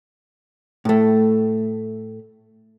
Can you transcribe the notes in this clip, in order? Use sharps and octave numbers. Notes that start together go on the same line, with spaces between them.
A2 A3